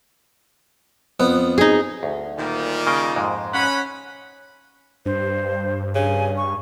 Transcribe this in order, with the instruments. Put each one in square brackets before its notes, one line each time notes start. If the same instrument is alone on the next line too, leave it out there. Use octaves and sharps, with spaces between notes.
[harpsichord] F2 B3
[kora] D#4 G#4
[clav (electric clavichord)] D2
[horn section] A#2 D#3 G3
[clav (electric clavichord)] C#3 A#3 G5
F2 G#2 G#3
[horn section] C#4 F#5 B5
[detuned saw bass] G2 [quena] C5
[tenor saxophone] C#3 [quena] G#5
[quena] C#6